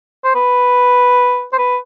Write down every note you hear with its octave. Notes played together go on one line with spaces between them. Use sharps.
C5
B4
C5
B4